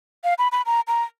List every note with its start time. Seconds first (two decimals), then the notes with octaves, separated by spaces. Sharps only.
0.24 F5
0.38 B5
0.52 B5
0.66 A#5
0.88 A#5